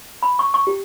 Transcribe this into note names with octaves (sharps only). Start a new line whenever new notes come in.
B5
C#6
C#6
G4